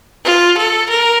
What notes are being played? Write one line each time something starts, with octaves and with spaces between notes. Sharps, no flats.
F4
A4
A#4